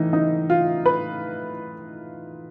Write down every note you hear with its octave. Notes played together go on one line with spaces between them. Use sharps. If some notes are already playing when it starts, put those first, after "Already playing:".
Already playing: A2 E3 D#4
D#4
F4
B4